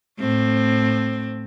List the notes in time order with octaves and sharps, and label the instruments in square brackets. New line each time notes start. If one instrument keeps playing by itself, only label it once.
[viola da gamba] A2 C4